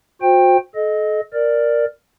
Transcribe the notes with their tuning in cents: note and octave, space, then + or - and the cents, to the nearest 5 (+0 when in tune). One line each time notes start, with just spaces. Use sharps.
F#4 -35 C5 +0 G5 +15
A4 -40 D#5 +0
A#4 +0 D5 +5